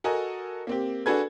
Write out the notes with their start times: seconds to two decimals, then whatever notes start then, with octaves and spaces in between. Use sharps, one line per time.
0.04 F#4 A4 A#4 D#5 G#5
0.67 A#3 C4 G4
1.06 D4 F#4 G#4 A4 B4 G#6